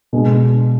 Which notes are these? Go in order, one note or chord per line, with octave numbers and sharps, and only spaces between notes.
B2 G#3 D4